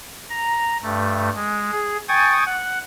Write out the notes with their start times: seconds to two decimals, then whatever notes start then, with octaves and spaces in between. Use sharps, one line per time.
0.30 A#5
0.83 G2 A3
1.35 G#3
1.72 G#4
2.08 G5 G#5 C#6 D#6 G#6 A6
2.46 F#5